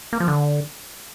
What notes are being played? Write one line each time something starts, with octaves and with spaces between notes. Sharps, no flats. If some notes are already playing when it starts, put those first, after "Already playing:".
A#3
F3
D3